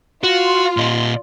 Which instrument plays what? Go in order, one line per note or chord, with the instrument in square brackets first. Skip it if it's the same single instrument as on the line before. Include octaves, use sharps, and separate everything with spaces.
[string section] F4 [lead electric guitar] F#4
[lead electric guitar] A#2 D#5